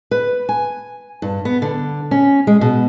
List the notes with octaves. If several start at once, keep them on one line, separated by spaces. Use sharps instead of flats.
B4
G#5
G2
B3
D3
C#4
G#3
B2